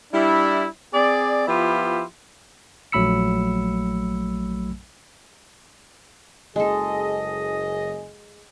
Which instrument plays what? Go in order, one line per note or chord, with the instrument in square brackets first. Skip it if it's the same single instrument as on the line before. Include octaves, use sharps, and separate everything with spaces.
[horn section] G3 D4 E4
C4 G#4 D5
F3 B3 E4 F4 G4
[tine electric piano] A#1 F#3 A3 B5 E6 C#7
[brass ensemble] F#1 G#4 D#5 [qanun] G#3 A4